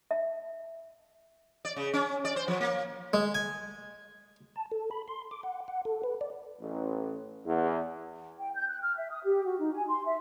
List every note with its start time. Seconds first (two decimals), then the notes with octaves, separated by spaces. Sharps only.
0.11 E5
1.65 D5
1.76 C#3
1.93 C#4
2.25 D5
2.36 C5
2.48 F3
2.61 A#3
3.13 G#3
3.35 G#5
4.56 A5
4.71 A4
4.91 B5
5.08 C6
5.31 D6
5.43 F#5
5.68 F#5
5.85 A4
6.03 B4
6.21 D5
6.60 A1
7.45 E2
8.39 G5
8.55 G6
8.68 F#6
8.82 F6
8.97 E5
9.10 D#6
9.25 G4
9.45 F#4
9.59 D#4
9.73 G#5
9.88 C6
10.06 E5